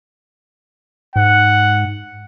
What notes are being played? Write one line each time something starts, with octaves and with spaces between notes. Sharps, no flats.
G#2 F#5